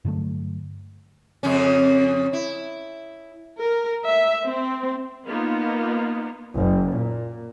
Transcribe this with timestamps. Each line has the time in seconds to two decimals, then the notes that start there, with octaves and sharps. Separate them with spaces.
0.05 G2 D3 F#3 A3
1.43 F2 C#3 C#4
2.33 E4
3.61 A#4
4.06 E5
4.46 C4
5.26 A#3 B3 D#4 F4
6.56 F#1
6.93 A#2